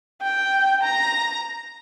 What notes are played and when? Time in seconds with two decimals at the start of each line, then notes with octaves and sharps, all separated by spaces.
0.22 G5
0.82 A#5